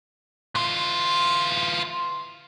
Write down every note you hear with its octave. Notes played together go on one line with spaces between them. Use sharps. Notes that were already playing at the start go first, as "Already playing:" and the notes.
E3 F4